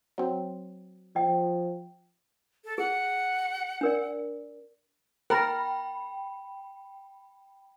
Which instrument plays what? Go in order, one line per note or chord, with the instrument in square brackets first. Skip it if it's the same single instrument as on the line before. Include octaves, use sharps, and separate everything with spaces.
[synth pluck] F#3 C4
[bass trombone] F3 [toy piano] D#5 G5
[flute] A4
[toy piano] G#4 [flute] F#5
[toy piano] D4 A#4 D5
[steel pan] A#4 [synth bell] G5 B5